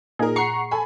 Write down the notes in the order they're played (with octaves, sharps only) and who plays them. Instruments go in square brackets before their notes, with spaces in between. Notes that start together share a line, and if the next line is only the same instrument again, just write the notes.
[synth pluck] A#2 G#4 [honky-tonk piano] D#4 A#4
[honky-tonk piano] F#5 A#5 [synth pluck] C#6 C7 C#7
[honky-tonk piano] A4 G#5 B5